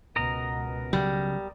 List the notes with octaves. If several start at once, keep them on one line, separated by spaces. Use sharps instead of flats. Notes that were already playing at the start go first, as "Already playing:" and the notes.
C#2 B2 B3 A#4 D#5 A#5
C#3 F#3 G3